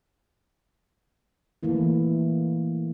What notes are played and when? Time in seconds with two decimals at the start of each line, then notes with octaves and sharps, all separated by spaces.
1.63 E3 A3 A#3 E4